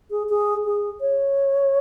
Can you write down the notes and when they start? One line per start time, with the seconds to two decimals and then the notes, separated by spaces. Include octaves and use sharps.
0.11 G#4
0.29 G#4
0.65 G#4
1.01 C#5